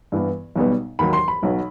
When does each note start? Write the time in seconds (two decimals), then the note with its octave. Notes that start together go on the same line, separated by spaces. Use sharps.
0.12 G2 E3 B3
0.56 B1 B2 G3 B3
0.99 D#2 D#3 F#3 B5
1.13 C6
1.28 B5
1.42 B1 B2 F#3 B3